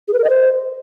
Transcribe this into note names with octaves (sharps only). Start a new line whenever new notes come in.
G#4
B4
A#4
D#5
C5